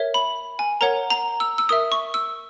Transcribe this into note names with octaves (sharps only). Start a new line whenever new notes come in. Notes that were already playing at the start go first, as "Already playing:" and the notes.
Already playing: A#4 C#5 E5
B5
G#5
A#4 C#5 F#5 A#5
A#5
E6
E6
A#4 E5 D#6
C#6
E6